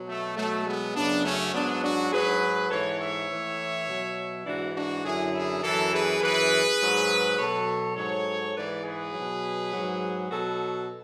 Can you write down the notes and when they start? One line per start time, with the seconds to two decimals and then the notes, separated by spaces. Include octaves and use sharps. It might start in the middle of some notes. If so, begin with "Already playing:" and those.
Already playing: B2 F#3
0.08 A3
0.37 B2 F#3 A3
0.66 G#3 B3
0.95 F#2 C#3 F#3 B3 D4
1.25 A3 C#4
1.54 G#2 F#3 B3 D4
1.83 D4 F#4
2.12 G#2 F#3 G#4 B4
2.70 G#2 E3 A4 C#5
3.00 C#5 E5
3.30 A2 E3
3.88 B2 F#3
4.46 G#2 E3 D4 F#4
4.75 D4 F#4
5.04 F#2 D3 F#3 E4 G#4
5.34 E4 G#4
5.63 F#2 E3 F#4 A4
5.92 G#4 B4
6.21 F#2 E3 G#4 B4
6.80 G#2 F#3
7.38 B2 F#3 A4 C#5
7.97 G#2 F#3 A4 C#5
8.55 G#2 E3 B4 D5
8.85 G#4 B4
9.13 B2 F#3
9.72 G#2 F#3
10.30 B2 F#3 F#4 A4